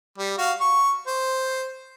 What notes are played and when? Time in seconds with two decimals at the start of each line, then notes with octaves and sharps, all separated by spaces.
0.18 G3
0.38 F#4 F5
0.61 C#6
1.07 C5